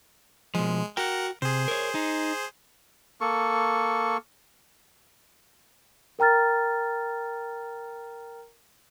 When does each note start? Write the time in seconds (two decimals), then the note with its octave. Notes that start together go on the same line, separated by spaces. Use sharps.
0.55 B2 F3 G#3
0.97 F#4 A#4 F#5 G5
1.42 C3 G#4 C5
1.68 A#4 C#5
1.95 D#4
3.21 A#3 A4 C#6
6.19 A#4 G5 A#5 F6 A6